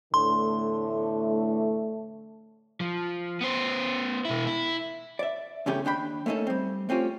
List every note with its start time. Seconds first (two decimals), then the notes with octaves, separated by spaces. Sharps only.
0.14 E2 A2 D3 A3 C6
2.80 F3
3.41 B3 C5
4.25 B2 E4
4.47 E4
5.19 D5 E5
5.66 E2 G2 C#3 A3 C#4 G4
5.85 D#2 D4 G5 B5
6.26 A3 A#3 C#4 D#4 A4
6.47 G3 C4
6.89 A3 C4 C#4 F4 G4